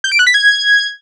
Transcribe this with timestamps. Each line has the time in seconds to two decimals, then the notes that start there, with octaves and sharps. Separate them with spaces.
0.04 G6
0.12 D7
0.19 F#6
0.27 B6
0.34 G#6